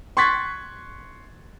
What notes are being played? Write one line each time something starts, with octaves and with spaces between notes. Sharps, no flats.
C6 C#6 F#6 G#6 A6 B6